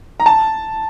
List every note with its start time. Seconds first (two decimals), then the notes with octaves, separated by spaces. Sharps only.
0.20 A#5
0.26 A5